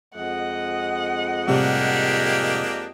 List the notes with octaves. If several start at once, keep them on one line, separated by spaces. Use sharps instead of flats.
F2 G#3 D#5 F#5
A2 C3 G3 A#3 D4 G4